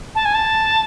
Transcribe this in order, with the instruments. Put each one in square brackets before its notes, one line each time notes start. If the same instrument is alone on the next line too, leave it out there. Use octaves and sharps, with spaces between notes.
[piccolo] A5
G#5
A5